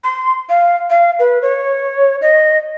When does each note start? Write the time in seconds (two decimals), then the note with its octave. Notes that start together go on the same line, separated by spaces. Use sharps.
0.04 C6
0.49 F5
0.90 F5
1.19 B4
1.42 C#5
2.22 D#5